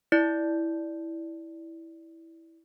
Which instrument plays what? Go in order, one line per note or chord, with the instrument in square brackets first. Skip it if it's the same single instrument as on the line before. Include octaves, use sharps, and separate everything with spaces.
[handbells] E4 D5